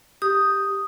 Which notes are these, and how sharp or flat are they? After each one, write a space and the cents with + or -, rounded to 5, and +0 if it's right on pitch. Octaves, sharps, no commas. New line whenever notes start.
G4 +0 D#6 +0